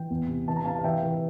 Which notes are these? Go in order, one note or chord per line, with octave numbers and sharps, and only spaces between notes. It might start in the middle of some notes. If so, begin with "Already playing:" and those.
Already playing: E3 G5
E2
C3
E3 A5
A#5
C3 F5 A5
F5
E3 E5 G5
E3